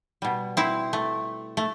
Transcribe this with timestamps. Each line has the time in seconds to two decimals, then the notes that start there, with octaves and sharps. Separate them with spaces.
0.22 B2 G3
0.57 C4 E4
0.93 A3
1.57 A3